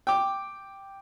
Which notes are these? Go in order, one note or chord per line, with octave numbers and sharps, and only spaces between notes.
G5 D6